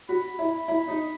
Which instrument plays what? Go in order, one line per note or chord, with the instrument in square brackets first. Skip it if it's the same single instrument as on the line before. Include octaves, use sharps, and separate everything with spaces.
[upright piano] F#4 [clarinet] B5
[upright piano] E4
E4
D#4